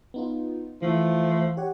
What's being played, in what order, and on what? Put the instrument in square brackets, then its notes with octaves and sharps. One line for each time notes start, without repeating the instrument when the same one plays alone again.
[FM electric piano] B3 D#4 F4
[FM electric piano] E3 [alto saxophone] F3 [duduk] A3
[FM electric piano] G4 C#5 F#5